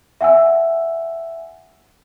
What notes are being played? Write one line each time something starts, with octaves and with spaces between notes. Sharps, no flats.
E5 F#5 G#5 E6